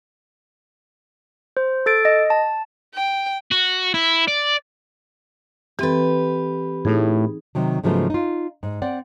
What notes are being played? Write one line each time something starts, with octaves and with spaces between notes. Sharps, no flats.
C5
A4 A6 D7
D#5
A5
G5
F#4
E4
D5
E3 C4 G4 A4 B4
A2 D#4 G#4
C3 D#3 F#3
G#2 C#3 F3 F#3 A3 B3
D#4 F4
G#2
C4 D5 F#5